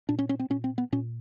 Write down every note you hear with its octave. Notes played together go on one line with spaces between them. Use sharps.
A#2 D4
C#4
C#4
C4
A#2 C#4
C4
B3
A#2 C#4